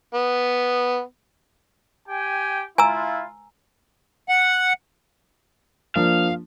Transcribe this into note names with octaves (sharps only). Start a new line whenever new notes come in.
B3
G4 G5 G#5
E4 F4 G#5 A#5 E6
F#5
F3 A#3 D4 F5